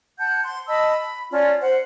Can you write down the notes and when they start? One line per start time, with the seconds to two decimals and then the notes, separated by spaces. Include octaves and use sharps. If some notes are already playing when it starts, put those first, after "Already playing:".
0.19 F#5 A5 G6
0.43 C6
0.68 D#5 A5 B5 E6
0.92 B5
1.31 C#4 F4 D5 A5
1.61 C5 F#5